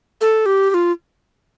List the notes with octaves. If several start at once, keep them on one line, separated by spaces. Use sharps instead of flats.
A4
G4
G4
F4